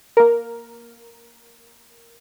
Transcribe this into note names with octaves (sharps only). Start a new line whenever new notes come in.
A#3 A#4